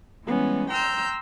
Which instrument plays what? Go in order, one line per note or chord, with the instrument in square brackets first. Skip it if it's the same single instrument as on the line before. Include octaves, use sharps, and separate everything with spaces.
[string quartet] E3 G3 G#3 B3 C#4
G5 A#5 C6 E6 F6 G6